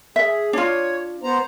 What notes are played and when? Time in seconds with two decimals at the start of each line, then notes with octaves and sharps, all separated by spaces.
0.16 G#4 E5
0.53 D4 F4 C#5
1.23 B3 C5 A#5